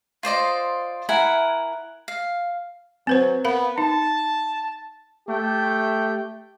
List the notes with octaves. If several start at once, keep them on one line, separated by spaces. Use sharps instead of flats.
F4 C5 D5 D#5
E4 A#4 F#5 G#5
F5
F#3 C4 B4 C5
B3 A#4 F5 B5
D#4 A5
A3 G4 G5